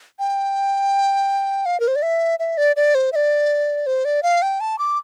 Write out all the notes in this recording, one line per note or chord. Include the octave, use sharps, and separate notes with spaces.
G5
F5
A#4
C5
D5
E5
E5
D5
D5
C5
E5
D5
C5
D5
F5
G5
A5
D6